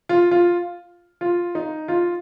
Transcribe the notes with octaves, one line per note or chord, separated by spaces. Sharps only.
F4
F4
F4
D#4
F4